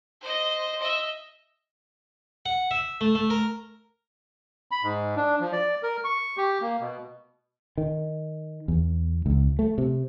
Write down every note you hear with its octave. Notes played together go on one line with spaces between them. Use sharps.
C5 D#5
D#5 E5
F#5
E5
A3
A3
A#4
B5
G#2
D4
F3
D5
A#4
C#6
G4
A#3
B2
D#3
E2
C#2
A3
C3